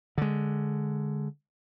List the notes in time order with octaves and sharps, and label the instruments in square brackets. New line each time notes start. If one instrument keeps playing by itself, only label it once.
[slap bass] D3 G#3